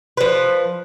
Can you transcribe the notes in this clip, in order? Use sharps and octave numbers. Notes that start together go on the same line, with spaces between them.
F3 B4